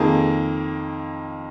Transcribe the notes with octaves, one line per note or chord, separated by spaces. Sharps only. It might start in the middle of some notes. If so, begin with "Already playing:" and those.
Already playing: F2 D#3 A#3 G#4